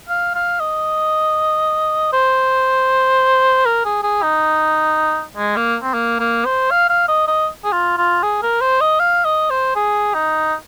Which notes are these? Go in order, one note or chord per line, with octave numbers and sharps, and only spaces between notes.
F5
F5
D#5
C5
A#4
G#4
G#4
D#4
G#3
A#3
C4
A#3
A#3
C5
F5
F5
D#5
D#5
G#4
F4
F4
G#4
A#4
C5
D#5
F5
D#5
C5
G#4
D#4